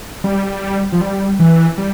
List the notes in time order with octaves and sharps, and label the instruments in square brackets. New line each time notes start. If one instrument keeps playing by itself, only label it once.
[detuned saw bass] G3
F3
G3
E3
G3